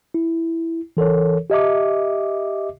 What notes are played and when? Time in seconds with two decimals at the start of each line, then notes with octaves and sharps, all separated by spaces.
0.14 E4
0.97 E3 A4 A#4 C#5
1.50 G4 D#5 E5 D6